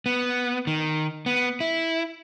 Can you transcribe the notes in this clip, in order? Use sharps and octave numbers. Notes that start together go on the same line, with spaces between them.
B3
D#3
B3
E4